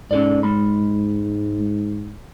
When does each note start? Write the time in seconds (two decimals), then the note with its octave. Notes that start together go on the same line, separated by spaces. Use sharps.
0.11 G#2 C#4 A4 D5
0.43 G#3 B5